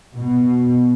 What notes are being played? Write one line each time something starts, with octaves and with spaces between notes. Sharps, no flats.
B2